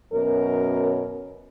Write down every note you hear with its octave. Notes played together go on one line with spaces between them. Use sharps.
F#2 B2 C#4 A#4